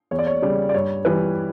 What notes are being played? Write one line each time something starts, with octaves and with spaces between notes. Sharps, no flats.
E2 C#5
D5
C#5
C#3 G3 D5
D5
G2 C#5
E3 G3 B4